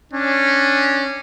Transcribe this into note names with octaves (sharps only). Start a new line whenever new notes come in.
C#4 D4